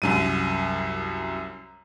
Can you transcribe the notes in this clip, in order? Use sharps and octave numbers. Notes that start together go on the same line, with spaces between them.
C2 F#2 D#7